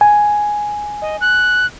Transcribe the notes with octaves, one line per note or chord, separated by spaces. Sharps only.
G#5
D#5
F#6